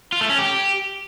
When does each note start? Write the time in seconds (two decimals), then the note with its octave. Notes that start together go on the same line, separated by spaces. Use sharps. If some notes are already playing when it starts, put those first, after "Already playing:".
0.12 F4
0.21 A3
0.29 C#4
0.38 G4